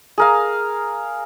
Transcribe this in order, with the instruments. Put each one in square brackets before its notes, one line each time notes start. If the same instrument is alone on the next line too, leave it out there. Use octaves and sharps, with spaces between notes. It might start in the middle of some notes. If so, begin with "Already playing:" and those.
[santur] G#4 A#4 F5